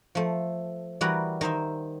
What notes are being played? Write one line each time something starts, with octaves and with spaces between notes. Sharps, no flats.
F3 A3
E3 G3 F#4 A#4 B4
D#3 D#4 C5 E5